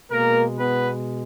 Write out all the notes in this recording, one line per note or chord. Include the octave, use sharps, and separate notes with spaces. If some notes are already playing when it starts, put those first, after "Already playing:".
B2 G#3 A#3 A#4
B3 B4